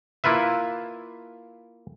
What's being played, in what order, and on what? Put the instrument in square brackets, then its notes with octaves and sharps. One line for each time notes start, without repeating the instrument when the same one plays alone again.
[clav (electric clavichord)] A#3 E4 F4 B4 E5